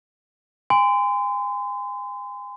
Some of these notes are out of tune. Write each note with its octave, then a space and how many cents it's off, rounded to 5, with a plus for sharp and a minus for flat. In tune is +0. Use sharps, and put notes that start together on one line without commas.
G#5 -35 C6 -35